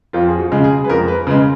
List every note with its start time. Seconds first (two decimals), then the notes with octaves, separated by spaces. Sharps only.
0.13 F2 F4
0.28 G#4
0.39 F#4
0.52 C#3 G#3
0.64 G#4
0.84 B4
0.89 F2 A#4
1.08 B4
1.27 C#3 G#3